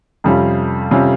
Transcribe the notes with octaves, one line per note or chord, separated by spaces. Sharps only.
F2 C3 G3 C#4 F4
C3 G3 C#4 F4